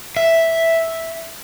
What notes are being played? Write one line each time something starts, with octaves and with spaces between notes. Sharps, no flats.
E5